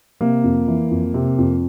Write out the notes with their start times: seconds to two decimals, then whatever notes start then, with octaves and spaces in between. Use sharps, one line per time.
0.21 C3 A#3
0.44 F2
0.68 E3
0.91 F2
1.14 C3
1.38 F2